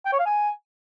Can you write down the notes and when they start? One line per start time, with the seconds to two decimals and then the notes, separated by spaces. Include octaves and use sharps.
0.06 G5
0.13 C#5
0.19 F5
0.26 G#5